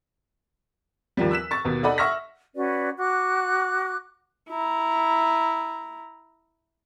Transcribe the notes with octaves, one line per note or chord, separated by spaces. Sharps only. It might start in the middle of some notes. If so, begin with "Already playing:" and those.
D#2 D#3 F3 G3
E6 F#6 B6 E7
C#6 A6
D#2 B2
D#4 A4 D5 D#5 F#5 B5
E5 F#5 C#6 E6 F6 A#6
C#4 F#4 B4 D5
F#4 D6 F#6
E4 A#5